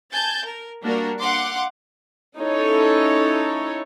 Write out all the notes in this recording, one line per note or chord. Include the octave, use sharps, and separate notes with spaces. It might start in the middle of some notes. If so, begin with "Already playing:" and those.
G#5 A5 G6 A6
A#4
G3 A#3 D4 F#4 A#4
F5 F#5 C6 D6
C#4 D#4 E4 A4 C#5